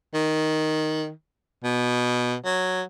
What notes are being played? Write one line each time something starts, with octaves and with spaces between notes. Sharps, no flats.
D#3
B2
F#3